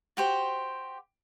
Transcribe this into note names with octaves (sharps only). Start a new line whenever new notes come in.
F#4 G4 C5